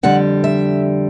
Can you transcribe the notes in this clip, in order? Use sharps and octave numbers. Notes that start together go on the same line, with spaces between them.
F2 D3 G3 F#5
E5